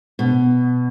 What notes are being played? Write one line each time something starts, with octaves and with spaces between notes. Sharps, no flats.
B2